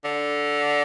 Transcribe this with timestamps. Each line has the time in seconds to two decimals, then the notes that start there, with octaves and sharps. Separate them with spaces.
0.04 D3